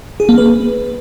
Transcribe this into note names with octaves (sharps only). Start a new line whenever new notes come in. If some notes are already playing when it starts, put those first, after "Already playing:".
G#4
A#3
B4